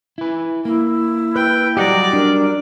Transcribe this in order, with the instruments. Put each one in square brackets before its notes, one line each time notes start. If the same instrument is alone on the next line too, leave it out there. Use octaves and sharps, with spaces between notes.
[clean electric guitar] E4 B4
[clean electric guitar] A#3 [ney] E4
[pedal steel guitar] B4 [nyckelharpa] G5
[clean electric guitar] F#3 G3 D#5 [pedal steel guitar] G4 F#5 A#5 [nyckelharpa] D5
[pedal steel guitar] D4 [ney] A#4